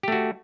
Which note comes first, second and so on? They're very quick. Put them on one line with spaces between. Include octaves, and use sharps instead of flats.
G4 A3 F#4